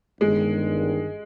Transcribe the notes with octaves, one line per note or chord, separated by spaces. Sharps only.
G1 G2 D#3 G#3